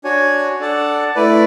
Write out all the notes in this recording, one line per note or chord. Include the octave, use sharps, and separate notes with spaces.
D4 F#4 C#5 G#5
D4 A4 D5 F#5 A5
A3 E4 B4 D5